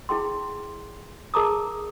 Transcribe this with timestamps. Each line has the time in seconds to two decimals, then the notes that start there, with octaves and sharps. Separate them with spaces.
0.09 E4 G#4 G5 C6
1.34 G#4 A#4 A5 A#5 D6 D#6